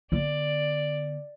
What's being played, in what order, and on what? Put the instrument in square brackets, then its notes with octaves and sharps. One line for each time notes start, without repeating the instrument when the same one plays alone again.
[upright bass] D3 B3 [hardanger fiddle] D5